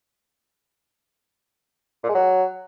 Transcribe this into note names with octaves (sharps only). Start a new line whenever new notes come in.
A#2
G#3
F#3